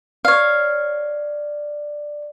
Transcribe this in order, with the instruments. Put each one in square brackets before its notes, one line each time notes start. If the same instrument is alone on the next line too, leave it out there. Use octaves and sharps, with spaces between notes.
[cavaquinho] C#5 F5 [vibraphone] D5